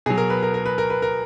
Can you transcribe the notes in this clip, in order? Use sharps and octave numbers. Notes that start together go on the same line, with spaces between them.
B2 F#3 G#4
A#4
B4
A#4
A#4
B4
A#4
B4
A#4